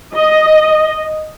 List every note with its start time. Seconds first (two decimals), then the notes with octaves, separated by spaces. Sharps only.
0.14 D#5